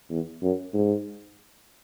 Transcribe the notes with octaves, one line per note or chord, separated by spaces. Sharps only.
E2
F#2
G#2